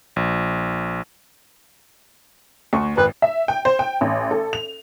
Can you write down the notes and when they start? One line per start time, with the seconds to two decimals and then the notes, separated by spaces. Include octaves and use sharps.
0.16 A#1
2.73 D2 C#6
2.97 G#1 B4
3.22 E5
3.48 G5
3.65 C5
3.79 G5
4.01 A1
4.31 A4
4.53 F7